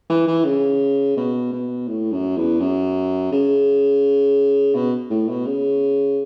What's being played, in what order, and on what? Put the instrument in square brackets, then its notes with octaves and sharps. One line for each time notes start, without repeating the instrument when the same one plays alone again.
[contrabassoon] E3
E3
C#3
B2
B2
A2
F#2
E2
F#2
C#3
B2
A2
B2
C#3